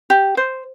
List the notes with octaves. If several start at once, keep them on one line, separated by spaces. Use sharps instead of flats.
G4
C5